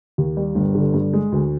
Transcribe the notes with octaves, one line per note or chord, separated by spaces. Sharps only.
D#2
G3
G1
D3
G2
G#3
D2